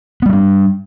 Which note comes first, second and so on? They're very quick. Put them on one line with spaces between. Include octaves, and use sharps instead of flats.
B3 G3 C#4 D4